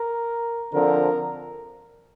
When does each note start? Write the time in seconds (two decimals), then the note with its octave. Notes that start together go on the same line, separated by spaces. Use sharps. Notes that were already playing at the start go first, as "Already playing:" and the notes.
Already playing: A#4
0.73 D3 F3 C4 A#4